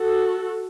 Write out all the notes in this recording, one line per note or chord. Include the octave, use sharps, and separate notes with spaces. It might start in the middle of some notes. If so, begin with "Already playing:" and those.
Already playing: F#4 A4